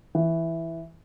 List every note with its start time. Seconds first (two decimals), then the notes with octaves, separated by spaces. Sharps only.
0.15 E3